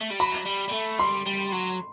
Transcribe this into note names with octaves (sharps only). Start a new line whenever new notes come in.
A3
G3
F#3 B5
G3
G3
A3
G3 C6
G3
F#3